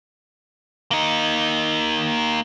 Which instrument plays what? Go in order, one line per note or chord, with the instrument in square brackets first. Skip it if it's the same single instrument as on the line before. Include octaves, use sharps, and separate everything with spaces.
[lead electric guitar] A#3 D#4